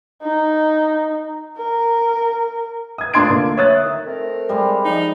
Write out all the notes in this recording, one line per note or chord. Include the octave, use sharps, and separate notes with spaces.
D#4
A#4
D#6 G#6
A3 D4 F4 C6 G#6 D7
D3 A#3
C#5 E5 D#6 F#6 A6
D#3 A3
A3 C4 A#4
G3 G#3
F3 D#4